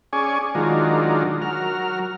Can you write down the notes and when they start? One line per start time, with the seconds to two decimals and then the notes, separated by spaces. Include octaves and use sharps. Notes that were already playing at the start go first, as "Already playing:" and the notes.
0.13 C#4 G#4 D5 G#5 C#6
0.55 D#3 F#3 G#3 D4 F4 A#4
1.42 F#3 A#4 F6